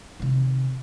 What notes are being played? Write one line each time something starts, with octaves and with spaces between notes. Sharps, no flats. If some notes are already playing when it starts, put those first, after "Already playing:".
C3 D#3